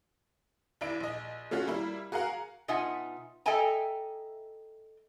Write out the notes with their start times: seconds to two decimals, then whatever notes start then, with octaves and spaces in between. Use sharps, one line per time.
0.81 D#2 D4 E4 D7
1.00 A#1 D#5
1.51 A3 C#4 F4 F#4
1.67 G3 A#3 E4
2.12 F#4 G#4 A#4 F5 F#5
2.68 B2 D#4 F4 E5 F#5 G#5
3.46 A4 D#5 E5 G5 G#5 A#5